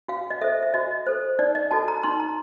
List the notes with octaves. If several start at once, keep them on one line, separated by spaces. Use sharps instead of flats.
F#4 F5
D#5
A4 C5 E5
E5
F#4 D#5
A4 C5
D#4 D5
D#5
F#4 A4 A5
A#5
D#4 C6
A#5